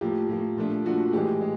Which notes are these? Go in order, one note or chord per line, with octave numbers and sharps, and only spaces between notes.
A2 F3 A#3 G4
A2 F3 A#3
A#2 F3 A3 D4
A#2 F3 A3 D4 F#4
A2 E3 G#3 G4
G#3